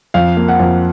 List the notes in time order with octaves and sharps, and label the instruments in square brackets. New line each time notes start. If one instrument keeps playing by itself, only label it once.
[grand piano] F2 F5
A#3
F#5
F2